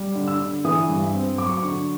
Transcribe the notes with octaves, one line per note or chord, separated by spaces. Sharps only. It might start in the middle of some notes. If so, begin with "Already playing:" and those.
Already playing: G3
D3
E6
D3
E3 D#6
G2
C4
F#3 D6
C#6
D6
D3 C#6